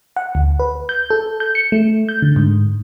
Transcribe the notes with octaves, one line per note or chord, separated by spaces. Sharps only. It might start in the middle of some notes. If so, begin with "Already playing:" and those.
F#5
D2
B4
G6
A4
G6
C#7
A3
G6
D3
G#2